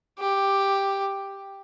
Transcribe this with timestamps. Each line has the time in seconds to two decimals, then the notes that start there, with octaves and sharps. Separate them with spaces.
0.19 G4